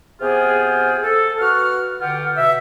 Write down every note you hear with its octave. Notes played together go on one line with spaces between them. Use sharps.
C3 B3 F4 G4 G#4
A4
B3 F#4 F5 F#5 F6
B2 D3 F4 G4 F#5
B2 E5